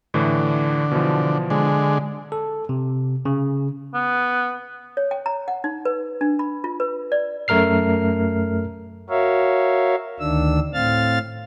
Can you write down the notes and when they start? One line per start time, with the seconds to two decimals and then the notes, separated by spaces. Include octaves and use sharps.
0.14 A2 D3 E3
0.91 B2 E3 F3
1.50 D3 G#3
2.32 A4
2.69 C3
3.25 C#3
3.94 B3
4.97 C#5
5.11 G5
5.26 A#5
5.48 F#5
5.64 D#4
5.85 B4
6.21 D4
6.39 B5
6.64 F4
6.80 B4
7.12 D5
7.48 F#2 A3 A#4 F6 C7
9.10 F#4 A#4 C#5 E5 F5
10.20 D2 D#3 D4 E6
10.73 A2 C4 F5 F6 A6